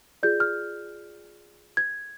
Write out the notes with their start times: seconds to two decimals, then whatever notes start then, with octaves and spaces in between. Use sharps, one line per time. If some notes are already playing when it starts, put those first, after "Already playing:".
0.23 F4 G#4 D5 G6
0.40 F6
1.77 G#6